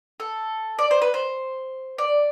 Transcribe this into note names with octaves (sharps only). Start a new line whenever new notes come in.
A4
D5
C5
B4
C5
D5